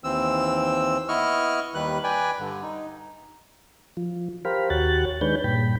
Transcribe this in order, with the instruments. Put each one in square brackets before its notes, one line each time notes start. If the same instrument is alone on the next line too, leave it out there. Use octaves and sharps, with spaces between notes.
[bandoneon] D#2 E3 C4 E6
B3 E4 D#5 C#6 F6
D#2 D#3 G3 B4 F#6
B4 D5 G5 G#5
G2 D3
D#4
[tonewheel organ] F3
G4 A#4 C5 F5 B5
D#2 F#4 G4 C#5 F#6 A6
D#3 G#3 D4 B4 C#5 G6
G2 A#2 G5 B5